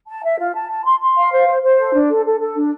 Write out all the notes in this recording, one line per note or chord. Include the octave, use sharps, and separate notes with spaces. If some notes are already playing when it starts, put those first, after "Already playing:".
A5
E5
F4
A5
A5
C6
C6
F5
C5
C5
C5
A4
D4
A4
A4
A4
D4